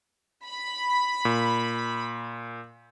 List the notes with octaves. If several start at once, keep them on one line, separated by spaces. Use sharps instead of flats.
B5
A#2